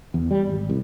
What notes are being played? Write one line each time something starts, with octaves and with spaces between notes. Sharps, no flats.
E2
G3
G#1
C2